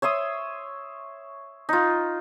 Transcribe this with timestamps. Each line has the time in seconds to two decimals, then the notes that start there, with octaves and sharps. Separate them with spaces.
0.02 C#5 E5 C6 D#6
1.69 D#4 F4